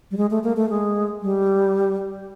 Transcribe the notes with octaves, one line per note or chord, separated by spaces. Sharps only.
G3
G#3
A3
A#3
A3
G#3
G3